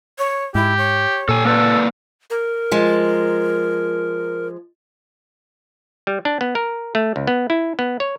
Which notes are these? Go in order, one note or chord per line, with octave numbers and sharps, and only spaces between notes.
C#5
G#2 E4 G4
C#5
A#2 A4 G#5
A#3 A4 B4 D5
A#4
F3 G#3
G3
D4
B3
A#4
A3
C#2
B3
E4
B3
C#5